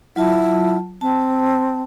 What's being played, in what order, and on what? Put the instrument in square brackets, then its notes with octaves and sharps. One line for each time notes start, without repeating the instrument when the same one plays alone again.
[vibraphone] F#3 F4 A5 [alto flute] E4
[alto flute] C4 [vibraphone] A5